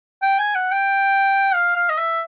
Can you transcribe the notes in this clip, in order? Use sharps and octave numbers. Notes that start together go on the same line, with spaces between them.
G5
G#5
F#5
G5
F5
F5
D#5
E5